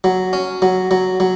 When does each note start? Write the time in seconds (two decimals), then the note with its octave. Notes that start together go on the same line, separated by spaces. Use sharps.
0.04 F#3
0.33 C#4
0.62 F#3
0.91 F#3
1.20 F#3